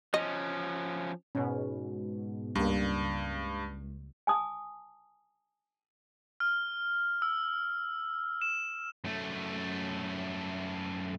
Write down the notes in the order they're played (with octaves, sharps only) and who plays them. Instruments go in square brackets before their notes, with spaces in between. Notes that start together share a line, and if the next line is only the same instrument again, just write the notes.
[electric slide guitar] F3 C#4 [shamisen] D#5
[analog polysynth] G#2 B2 [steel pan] C#4
[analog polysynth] C#2 [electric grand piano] G2 [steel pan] G3 A#3
[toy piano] G#5 A5 D#6
[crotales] F6
E6
E7
[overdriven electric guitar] F#2 A3